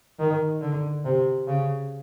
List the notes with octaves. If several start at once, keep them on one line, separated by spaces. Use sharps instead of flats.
D#3
D3
C3
C#3